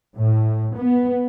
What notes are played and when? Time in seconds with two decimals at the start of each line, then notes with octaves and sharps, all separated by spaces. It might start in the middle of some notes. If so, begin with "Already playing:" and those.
0.17 A2
0.76 B3